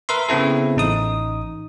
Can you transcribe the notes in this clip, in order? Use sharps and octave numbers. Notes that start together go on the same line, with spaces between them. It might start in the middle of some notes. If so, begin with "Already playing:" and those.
A#4 B4 E5 C6
C#3 B3 C4 E4 A4
A1 D#4 D#6